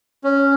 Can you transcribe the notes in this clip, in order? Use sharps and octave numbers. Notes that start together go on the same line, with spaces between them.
C#4